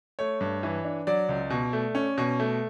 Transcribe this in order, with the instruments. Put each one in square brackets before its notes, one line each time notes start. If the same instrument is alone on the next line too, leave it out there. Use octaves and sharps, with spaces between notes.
[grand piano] A3 C#5
G2
E3
D4
F#3 D5
C#2
B2
A3
C#4
B2
A3